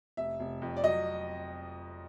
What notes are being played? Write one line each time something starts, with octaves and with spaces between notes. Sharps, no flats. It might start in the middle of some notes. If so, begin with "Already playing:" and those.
F1 E5
F1
F2
D5
F#3 D#5